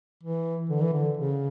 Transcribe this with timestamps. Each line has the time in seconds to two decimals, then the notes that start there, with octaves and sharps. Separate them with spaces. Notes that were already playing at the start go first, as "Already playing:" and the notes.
0.23 E3
0.70 D3
0.81 E3
0.93 D3
1.17 C#3